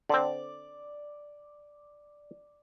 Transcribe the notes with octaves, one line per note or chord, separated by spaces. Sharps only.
D3 C4 D5 D6